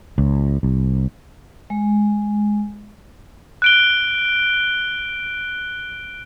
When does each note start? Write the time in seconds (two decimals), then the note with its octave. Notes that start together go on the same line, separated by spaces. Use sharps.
0.18 C#2
0.63 C2
1.70 G#3
3.62 F#6 D7 G7